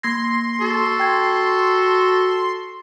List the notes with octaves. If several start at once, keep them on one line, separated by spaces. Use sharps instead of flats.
A#3 C6 G#6 A#6
F#4 A4
G5 G#6